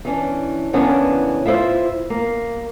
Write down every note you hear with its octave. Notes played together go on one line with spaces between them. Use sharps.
E3 C#4 D4
C#3 E3 A#3 B3 C#4 D4
E4 F4 C5 D5 E5
A#3